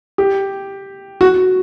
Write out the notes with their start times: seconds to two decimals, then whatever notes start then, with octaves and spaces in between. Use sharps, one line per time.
0.18 G4
1.21 F#4